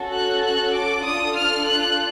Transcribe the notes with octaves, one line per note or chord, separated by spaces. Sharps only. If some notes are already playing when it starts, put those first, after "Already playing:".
Already playing: C#4 F#4 A4
F#6
F#6
D6
D4 F4 A4 D#6
F6
F#6